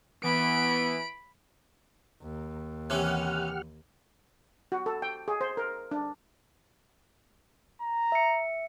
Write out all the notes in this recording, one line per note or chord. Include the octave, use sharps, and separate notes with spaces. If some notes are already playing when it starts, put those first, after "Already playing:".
E3 B3 B5 D7
D#2
C3 E3 C#4 G4 F#5 F6
F#4
A4
G5
G#4
C5
A#4
D4
A#5
E5 C#7